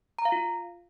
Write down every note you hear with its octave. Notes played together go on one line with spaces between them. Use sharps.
A#5
F5
F4